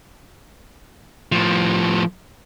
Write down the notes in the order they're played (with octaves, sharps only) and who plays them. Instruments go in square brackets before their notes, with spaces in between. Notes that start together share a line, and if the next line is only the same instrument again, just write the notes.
[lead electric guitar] A2 F3